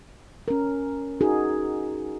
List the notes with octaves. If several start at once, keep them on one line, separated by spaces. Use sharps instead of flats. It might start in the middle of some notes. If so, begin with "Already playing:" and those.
C#4 A#4
D#4 F#4 G#4 A#4